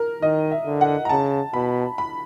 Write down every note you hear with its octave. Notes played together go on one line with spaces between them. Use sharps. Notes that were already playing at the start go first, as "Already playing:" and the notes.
Already playing: A#4
D#3 D#5
E5
D3
F#5
A#5
C#3 A5
B2 B5
B5